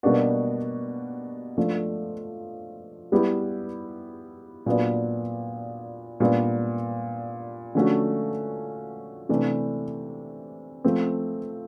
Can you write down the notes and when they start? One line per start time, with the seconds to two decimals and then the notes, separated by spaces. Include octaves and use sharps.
0.03 B2 G3 A#3 D4 F#4
1.57 F3 A3 D4
3.12 G3 B3 E4 G4
4.66 A#2 F#3 B3 D4
6.20 A#2 G3 B3 D4
7.75 D3 F3 A3 C#4 F#4
9.29 C3 E3 A3 D4
10.84 F3 A3 C4